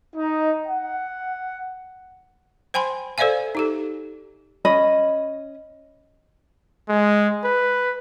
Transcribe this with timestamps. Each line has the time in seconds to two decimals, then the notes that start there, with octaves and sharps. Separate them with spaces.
0.15 D#4
0.66 F#5
2.74 C5 G5 G#5 B5 C6
3.18 A4 C5 D5 E5 F5 G#5
3.55 D#4 G4 A4
4.65 C#4 D#5 B5
6.89 G#3
7.44 B4